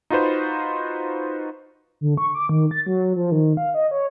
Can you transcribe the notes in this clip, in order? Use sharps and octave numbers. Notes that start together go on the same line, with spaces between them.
D#4 F4 F#4 B4 C5
D3
C#6
D6
D#3
A6
F#3
F3
D#3
F5
D#5
C#5